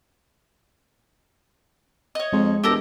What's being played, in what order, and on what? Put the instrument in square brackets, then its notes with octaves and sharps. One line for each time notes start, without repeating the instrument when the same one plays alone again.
[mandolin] C#5 D#5
[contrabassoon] F2 [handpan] G#3
[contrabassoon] E1 [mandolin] G4 A4 A#4